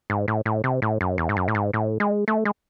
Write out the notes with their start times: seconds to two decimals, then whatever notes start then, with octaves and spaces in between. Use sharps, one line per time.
0.10 G#2
0.28 A2
0.45 A2
0.64 C3
0.82 A2
1.01 F#2
1.18 E2
1.29 G#2
1.37 F#2
1.48 A2
1.55 G#2
1.74 A2
2.00 G#3
2.28 A3
2.45 G#3